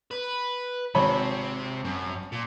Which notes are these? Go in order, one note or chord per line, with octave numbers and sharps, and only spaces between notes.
B4
G#1 C3 C4 C#5 B5
F#2
A#2